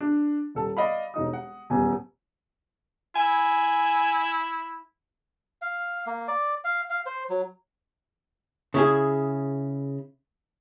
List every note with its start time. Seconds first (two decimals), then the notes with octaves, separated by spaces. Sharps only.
0.01 D4
0.55 D#1 A4 A5
0.77 D5 D#5 F5 B5
1.14 E1 D#4 D#6
1.33 F#5
1.70 D#1 E2 G#5
3.16 E4 G#5
5.62 F5
6.07 A#3
6.28 D5
6.64 F5
6.90 F5
7.06 C5
7.30 F#3
8.74 C#3 E4 G#4